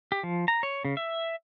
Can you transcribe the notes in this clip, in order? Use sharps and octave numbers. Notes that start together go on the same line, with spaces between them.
G4
F3
A#5
C#5
C#3
E5